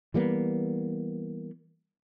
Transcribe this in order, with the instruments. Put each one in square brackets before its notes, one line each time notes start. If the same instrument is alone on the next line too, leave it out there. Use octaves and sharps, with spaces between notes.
[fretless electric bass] E3 G3 A#3 B3